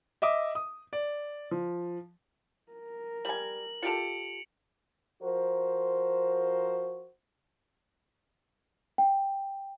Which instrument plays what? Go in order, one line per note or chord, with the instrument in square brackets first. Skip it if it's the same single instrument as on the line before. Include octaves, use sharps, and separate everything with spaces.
[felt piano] D#5 E5 D6 D#6
D#6
D5
F3
[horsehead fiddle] A#4
[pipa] G3 G#5 [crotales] F#7
[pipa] F4 G4 A4 [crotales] C#7 D7 F7
[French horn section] F3 F#4 A#4 C5
[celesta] G5